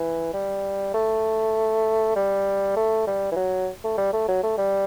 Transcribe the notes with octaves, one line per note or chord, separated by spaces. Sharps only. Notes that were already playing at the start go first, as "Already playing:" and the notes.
Already playing: E3
G3
A3
G3
A3
G3
E3
F#3
A3
G3
A3
F#3
A3
G3